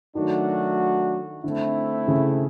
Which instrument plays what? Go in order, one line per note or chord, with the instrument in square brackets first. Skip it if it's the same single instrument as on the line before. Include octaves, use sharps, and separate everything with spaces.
[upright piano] D#3 [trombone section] F#3 A3 D4 F#4
[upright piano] D3 [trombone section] A3 C4 E4
[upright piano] C#3